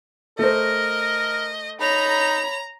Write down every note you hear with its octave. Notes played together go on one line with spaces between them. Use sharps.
A3 A#4 C5 D#5
D#4 C#5 A#5 B5 F7